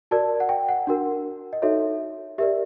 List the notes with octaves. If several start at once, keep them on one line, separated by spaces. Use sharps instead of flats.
F#4 A#4 D5 A5
F#5
G5
F#5
D4 F#4 A#4
D#5
D#4 F#4 A4 C#5 E5
G4 A#4 D5 E5